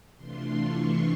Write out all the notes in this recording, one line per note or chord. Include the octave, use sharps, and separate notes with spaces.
C3 E3 A3 D4 F4 C6
C#6